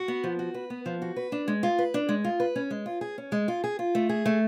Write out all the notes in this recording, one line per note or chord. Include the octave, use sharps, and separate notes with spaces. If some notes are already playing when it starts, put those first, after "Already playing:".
Already playing: F#4
B3
F3
F#4
B4
B3
F3
F#4
B4
D4
G#3
F4
B4
D4
G#3
F4
B4
C#4
G#3
F4
G#4
C#4
G#3
F4
G#4
F4
A3
G#4
A3